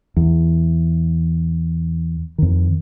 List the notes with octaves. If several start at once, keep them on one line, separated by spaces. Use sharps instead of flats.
E2
F2 D#3